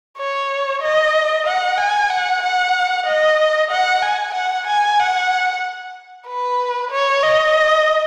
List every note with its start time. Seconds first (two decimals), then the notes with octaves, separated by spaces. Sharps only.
0.18 C#5
0.82 D#5
1.46 F#5
1.78 G#5
2.10 F#5
2.42 F#5
3.06 D#5
3.71 F#5
4.02 G#5
4.34 F#5
4.67 G#5
4.99 F#5
6.27 B4
6.91 C#5
7.23 D#5